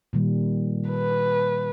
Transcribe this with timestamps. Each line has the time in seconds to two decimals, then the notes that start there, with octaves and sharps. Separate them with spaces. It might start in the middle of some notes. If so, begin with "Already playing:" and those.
0.13 A#2 D#3 G3
0.89 B4